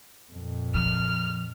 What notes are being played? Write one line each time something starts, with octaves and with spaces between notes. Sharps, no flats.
F2 A#2
F3 F6